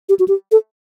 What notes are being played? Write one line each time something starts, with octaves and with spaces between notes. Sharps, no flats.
G4
F#4
G4
A4